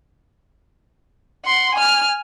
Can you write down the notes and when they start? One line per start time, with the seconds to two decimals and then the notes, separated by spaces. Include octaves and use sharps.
1.45 F#5 C6
1.75 G#5 F6